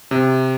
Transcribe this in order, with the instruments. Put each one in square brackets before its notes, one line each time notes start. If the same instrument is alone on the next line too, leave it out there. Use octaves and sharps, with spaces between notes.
[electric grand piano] C3